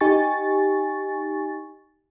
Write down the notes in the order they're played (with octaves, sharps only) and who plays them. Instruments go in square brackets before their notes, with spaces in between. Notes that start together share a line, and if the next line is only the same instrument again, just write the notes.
[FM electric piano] D#4 G4 G#5 C#6 A6